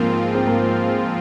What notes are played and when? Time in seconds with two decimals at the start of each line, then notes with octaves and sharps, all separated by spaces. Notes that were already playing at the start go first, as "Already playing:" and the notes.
Already playing: G#2 F3 A#3 C4 F4
0.35 C4
0.47 A#3